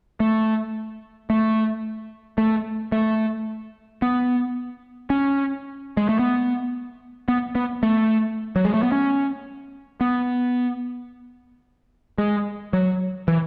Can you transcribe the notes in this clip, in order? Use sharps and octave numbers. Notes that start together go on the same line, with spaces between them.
A3
A3
A3
A3
B3
C#4
G#3
A3
B3
B3
B3
A3
F#3
G#3
A3
B3
C#4
B3
G#3
F#3
E3